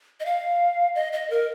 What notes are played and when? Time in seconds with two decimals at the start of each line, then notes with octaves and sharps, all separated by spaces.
0.20 D#5
0.26 F5
0.95 D#5
1.13 D#5
1.30 A#4